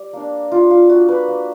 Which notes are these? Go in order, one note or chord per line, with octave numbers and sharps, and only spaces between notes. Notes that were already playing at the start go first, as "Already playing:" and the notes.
Already playing: G3
A#3 D4
G3 F4
F4
A#3 D4 F#4
B4
A#3